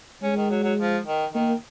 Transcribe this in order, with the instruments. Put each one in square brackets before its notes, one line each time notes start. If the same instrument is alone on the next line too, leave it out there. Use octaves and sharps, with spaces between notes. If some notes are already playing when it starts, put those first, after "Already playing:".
[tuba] G#3 [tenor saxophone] C#4
[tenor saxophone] D#3
F#3
F#3
F3
D#3
[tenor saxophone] D#3 [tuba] A#3